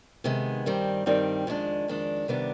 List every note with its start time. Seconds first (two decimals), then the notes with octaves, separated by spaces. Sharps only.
0.24 C3 D#3 G#3 B3
0.66 G2 D#3 G3 C4
1.06 G2 D#3 G3 C4
1.47 F2 D#3 G#3 D4
1.88 F2 D#3 G#3 D4
2.28 C3 D#3 G3 B3 D4